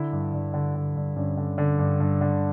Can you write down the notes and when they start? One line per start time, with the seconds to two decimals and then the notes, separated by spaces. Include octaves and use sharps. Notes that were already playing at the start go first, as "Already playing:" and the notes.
Already playing: D3 E4
0.12 G2
0.34 G2
0.54 D3
0.75 D3
0.96 G2
1.16 G2 C#4
1.37 D3
1.58 D3
1.79 G2
2.00 G2
2.21 D3